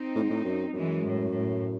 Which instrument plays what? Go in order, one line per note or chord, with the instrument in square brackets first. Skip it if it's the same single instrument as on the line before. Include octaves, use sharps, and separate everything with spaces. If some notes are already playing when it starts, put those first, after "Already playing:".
Already playing: [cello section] C4 D#4
[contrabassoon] A2
G#2
A2
F#2
[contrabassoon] F#2 [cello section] E3 G#3
[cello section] A2
A2